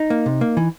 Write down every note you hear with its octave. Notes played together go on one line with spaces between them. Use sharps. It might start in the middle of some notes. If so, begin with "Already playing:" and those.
Already playing: D#4
A#3
C3
A#3
E3